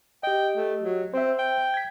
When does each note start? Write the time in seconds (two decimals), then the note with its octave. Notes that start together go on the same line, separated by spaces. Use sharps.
0.23 G4 D#5 G5
0.56 A3
0.83 F#3
1.14 C4 C5 E5
1.39 G5
1.74 G#6 B6